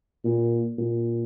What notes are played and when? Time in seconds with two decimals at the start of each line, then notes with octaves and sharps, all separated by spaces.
0.25 A#2
0.78 A#2